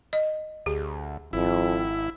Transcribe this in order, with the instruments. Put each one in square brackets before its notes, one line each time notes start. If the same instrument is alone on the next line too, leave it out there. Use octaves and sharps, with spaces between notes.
[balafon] D#5
[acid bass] D2 [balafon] G4 G#4
[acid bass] G#1 [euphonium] F2 [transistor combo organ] E4